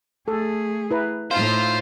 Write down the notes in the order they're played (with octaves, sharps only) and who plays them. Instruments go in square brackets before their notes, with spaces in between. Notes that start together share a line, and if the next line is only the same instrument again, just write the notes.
[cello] A3 G#4 [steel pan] A4
[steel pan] E4 B4 A#5
[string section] A2 F4 [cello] D#4 [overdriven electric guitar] C5 [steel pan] F5